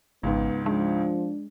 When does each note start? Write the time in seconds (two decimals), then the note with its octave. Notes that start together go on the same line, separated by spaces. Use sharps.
0.23 G#1 C#2 G#2 B3
0.66 F3 G#3 D4